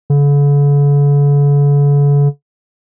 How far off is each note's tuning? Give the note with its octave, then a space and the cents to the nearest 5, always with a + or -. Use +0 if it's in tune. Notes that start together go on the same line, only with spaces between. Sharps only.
D3 -45